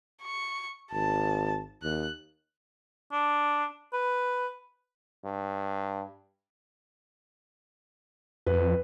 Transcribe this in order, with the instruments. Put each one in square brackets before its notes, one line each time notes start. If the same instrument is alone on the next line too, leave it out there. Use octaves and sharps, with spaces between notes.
[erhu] C#6
[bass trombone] G#1 [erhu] A5
[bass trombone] D#2 [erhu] F#6
[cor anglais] D4
B4
[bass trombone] G2
[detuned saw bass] F2 [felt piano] B4